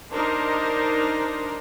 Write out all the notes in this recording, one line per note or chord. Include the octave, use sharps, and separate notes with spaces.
D4 D#4 A#4 C5